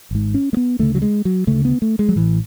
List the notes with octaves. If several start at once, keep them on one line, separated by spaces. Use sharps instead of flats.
G#1 G#2
C#4
A3
B3
D2 C#3 A3
F#3
G#3
F#3
D2 C#3 A3
B3
A3
G#3
F#3
A1 A2 E3